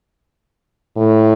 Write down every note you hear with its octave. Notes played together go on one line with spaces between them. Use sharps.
A2